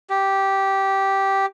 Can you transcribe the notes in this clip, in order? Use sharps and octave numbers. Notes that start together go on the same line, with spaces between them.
G4